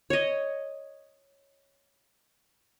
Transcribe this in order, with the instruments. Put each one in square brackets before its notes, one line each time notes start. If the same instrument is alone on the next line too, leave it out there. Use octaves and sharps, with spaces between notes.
[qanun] C#5 D#5